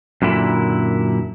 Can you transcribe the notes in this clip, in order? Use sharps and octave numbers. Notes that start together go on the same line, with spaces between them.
F#2 A#2 D3 E4